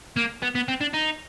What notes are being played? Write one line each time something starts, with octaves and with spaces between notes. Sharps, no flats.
A#3
B3
B3
C4
D4
D#4